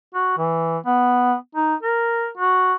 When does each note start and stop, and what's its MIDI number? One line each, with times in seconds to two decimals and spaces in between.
0.15 0.37 66
0.38 0.78 52
0.86 1.35 59
1.55 1.75 63
1.83 2.29 70
2.37 2.75 66